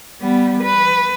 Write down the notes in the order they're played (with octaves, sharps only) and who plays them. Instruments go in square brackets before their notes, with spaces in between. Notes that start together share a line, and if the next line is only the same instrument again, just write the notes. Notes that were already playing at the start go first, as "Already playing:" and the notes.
[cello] G3 B3
B4